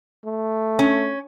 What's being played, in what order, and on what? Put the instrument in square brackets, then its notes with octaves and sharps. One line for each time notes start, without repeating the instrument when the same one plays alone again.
[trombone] A3
[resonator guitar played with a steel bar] C#4